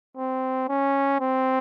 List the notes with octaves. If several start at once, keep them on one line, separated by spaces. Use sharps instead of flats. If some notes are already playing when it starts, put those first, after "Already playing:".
C4
C#4
C4